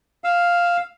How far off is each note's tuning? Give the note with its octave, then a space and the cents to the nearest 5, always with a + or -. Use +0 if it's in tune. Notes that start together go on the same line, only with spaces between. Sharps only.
F5 +0 E6 +0